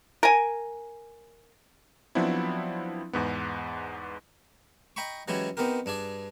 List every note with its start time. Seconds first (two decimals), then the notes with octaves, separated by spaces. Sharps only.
0.23 A#4 G#5
2.15 F3 F#3 B3 C4 D4 E4
3.13 E2 G#2 B3
4.96 D#5 G5 A#5 B5 C#6
5.28 E3 F#3 G#3 C#4 E4 G4
5.57 B3 C4 D#4 G4 A#4
5.86 G2 D4 G#4 D5